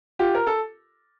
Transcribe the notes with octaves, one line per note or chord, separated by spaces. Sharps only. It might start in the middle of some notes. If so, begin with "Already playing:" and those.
F4 G4
A#4
A4